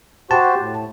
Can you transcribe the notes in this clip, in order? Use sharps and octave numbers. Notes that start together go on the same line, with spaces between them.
F#4 G4 C5 A5
A2